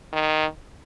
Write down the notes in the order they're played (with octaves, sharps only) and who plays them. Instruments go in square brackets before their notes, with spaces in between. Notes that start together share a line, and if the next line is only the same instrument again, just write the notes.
[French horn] D#3